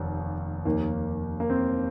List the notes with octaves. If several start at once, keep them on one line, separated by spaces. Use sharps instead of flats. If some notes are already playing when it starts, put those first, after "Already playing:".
Already playing: F1 D#2
F1 D#2 D#3 A#3
A#3
C4